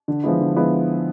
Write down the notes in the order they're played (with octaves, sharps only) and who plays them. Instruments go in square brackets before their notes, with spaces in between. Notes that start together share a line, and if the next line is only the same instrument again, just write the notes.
[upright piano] D3
F3 G#3 B3 E4
D3
F3 G#3 B3 E4